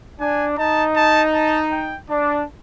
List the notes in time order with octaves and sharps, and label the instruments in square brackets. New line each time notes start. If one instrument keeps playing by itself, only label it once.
[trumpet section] D4 [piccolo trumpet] G#5
[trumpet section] D#4 [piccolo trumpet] A5
[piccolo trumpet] A5
A5
G5
[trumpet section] D4 [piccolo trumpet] D5